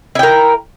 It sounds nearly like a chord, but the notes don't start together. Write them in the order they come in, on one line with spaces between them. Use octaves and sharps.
E4 G5 A#4